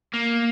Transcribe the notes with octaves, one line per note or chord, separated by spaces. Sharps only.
A#3